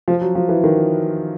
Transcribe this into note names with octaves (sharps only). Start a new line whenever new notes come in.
F3
F#3
F3
E3
D#3